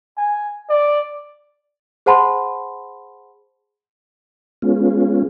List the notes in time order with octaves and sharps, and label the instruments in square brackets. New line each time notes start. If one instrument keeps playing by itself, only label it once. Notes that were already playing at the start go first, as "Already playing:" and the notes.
[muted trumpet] G#5
D5
[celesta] G#4 C5 F#5 A5 B5 C6
[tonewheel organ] G#3 B3 C#4 F4